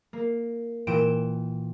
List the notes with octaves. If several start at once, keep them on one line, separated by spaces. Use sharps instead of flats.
A#3
A#2 E3 G5 D7 E7